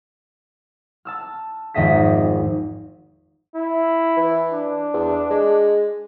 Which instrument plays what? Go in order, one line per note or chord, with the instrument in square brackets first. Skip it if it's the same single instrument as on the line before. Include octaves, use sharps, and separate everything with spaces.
[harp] A5 E6 F6
G#1 F2 D#5 E5 B6
[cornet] E4
[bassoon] E3
[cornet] D4
[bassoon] E2
G#3